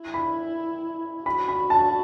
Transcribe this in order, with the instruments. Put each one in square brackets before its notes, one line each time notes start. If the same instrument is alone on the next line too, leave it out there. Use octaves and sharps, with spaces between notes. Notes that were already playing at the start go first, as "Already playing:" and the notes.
Already playing: [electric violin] E4
[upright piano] B5
[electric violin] F#4 [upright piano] B5
[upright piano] B5
A5